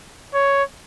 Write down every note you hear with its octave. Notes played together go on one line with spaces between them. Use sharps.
C#5